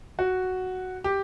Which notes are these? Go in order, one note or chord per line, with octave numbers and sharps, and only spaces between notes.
F#4
G4